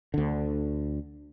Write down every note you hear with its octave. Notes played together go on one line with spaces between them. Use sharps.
D2 D3